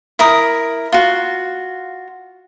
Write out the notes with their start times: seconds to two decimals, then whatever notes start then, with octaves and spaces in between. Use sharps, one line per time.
0.19 E4 A#4 D#6
0.92 F4 F#4